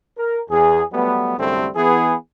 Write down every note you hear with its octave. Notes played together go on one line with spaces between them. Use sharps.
A#4
E2 G#4
F#3 G3 A3 B3
C2 F#2 D3 G3 A3 C4
E3 B3 G#4